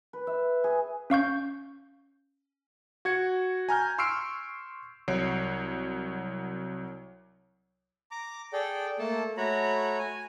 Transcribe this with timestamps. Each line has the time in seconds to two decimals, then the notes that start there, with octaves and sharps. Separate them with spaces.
0.13 B4
0.27 E5
0.64 G#4
1.10 C#4 F5 C#6 G6
3.05 F#4 G#6 C#7
3.69 G#5 A#5 F6 G6
3.98 C6 C#6 E6 F6 C7 D7
5.08 C2 F#3 C#5 C7 D7
8.11 A#5 D6
8.53 G#4 A4 D5 G5
8.99 A3 A#3 A4 A5
9.37 A3 F#4 C#5 A#5 B5
9.99 G#5